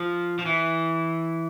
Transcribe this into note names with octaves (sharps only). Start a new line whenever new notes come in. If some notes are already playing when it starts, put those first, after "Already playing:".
Already playing: F3
F3
E3